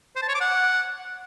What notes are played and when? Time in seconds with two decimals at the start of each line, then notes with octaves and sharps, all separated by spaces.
0.16 C5
0.22 A5
0.28 C#5
0.35 D6
0.41 F#5